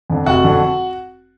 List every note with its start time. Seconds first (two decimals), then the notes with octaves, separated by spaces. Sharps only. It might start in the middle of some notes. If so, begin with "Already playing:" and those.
0.10 F2 D3
0.26 F1 F#4 F#5
0.44 F2 D3